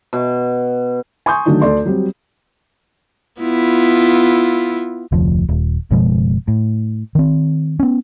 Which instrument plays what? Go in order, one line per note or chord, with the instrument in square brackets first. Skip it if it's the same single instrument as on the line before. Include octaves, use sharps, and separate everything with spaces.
[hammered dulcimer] B2
[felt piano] G#5 C6 C#6 D#6 G6
D3 D#3 F#3 A3 D4 D#4
D2 A4 D5 C6
F#3 G3 C4
[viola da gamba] B3 E4 F4
[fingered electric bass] F1 D2 F3
D#1
F#1 B2 F3 G#3
A2
D#3 C4
B3 C#4